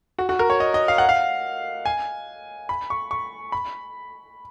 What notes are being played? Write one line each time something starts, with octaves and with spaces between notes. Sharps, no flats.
F#4
F#4
A#4
C#5
D#5
D#5
F5
F#5
F5
G#5
B5
C#6
C#6
B5